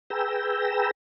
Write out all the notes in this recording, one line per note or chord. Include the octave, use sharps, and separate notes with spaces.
G#4 B4 G5 A#5 E6